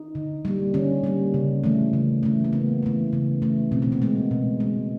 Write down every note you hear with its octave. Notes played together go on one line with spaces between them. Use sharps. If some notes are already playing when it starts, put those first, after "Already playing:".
Already playing: D#4
D3
G3 A#3
D3 C#4
G3 A#3
C#3
E3 A3
C#3
E3 A3
A#3
C#3 B3
E3 A3
C#3
E3 A3
B2 C4
B3
A#3
G#3 B3
B2
G#3